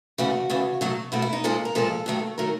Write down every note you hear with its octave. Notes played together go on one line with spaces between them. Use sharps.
E2 C#3 E3 A3 F#4
E2 C#3 E3 A3
B2 F#3 A3
B2 F#3 A3 E4
E4
D#4
A#2 F3 G#3 A4
A#4
A#2 F3 G#3 A4
G2 D#3 F#3 A3
D#3 F#3 A3 A#4